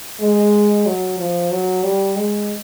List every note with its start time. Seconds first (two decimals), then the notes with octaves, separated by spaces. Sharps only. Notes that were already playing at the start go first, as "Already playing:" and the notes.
0.20 G#3
0.86 F#3
1.18 F3
1.51 F#3
1.84 G3
2.16 G#3